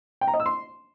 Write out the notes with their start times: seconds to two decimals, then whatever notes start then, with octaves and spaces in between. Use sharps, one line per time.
0.21 G5
0.28 A#5
0.34 D#5
0.40 E6
0.46 C6